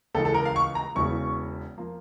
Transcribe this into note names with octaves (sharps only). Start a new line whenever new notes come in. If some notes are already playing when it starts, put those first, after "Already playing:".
C#2 C#3 E3 A#3 A4
A4
A#4
F5
C#6
A#5
E1 E2 C#3 E3 C#6
F3 A#3